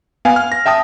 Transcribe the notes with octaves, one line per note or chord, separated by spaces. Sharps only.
B3 F5 G#5
F6
A#6
E5 G5 A5 D#6